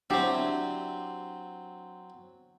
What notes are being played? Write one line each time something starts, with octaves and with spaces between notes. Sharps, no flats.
F#3 C4 D4 E4 G4